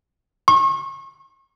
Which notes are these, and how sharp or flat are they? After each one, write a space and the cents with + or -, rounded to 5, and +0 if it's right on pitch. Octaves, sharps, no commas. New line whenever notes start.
C#6 -40